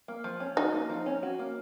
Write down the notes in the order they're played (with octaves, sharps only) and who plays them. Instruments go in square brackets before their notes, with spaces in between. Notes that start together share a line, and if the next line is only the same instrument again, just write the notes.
[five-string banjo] A#3
F3
C#4
[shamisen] D#4 [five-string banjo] F#4
[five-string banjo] A#3
F3
C#4
F#4
A#3